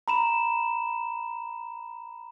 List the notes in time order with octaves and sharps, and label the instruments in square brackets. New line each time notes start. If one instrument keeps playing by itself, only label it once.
[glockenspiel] A#5 B5 E7